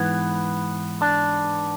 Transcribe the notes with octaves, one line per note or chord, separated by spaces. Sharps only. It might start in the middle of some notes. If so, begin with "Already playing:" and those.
Already playing: G#2 E3 B3
D4